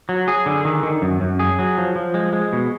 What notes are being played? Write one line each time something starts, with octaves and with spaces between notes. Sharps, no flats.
F#3
G#4
D3
D#3
D#3
F#2
F#2
G#4
F#3
F3
F3
G#3
G#3
B2